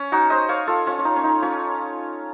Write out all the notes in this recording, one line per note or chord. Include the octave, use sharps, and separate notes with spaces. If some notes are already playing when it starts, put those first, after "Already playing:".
Already playing: C#4
D#4 F#4
C5 D#5
C#5 F5
F4 A4
C#4 F4
C#4
D#4
C#4
D#4
C#4 F4